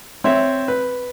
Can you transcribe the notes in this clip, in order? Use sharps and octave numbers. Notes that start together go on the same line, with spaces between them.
C4 C#5 E5
B4